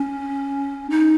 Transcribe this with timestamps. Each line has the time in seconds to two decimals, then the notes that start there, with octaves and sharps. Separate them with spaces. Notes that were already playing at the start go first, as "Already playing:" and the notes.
Already playing: C#4
0.90 D#4